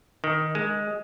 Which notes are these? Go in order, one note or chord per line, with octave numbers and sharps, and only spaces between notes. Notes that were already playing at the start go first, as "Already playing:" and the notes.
D#3
G#3